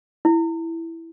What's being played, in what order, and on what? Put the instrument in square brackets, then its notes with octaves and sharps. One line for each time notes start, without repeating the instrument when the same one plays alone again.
[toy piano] E4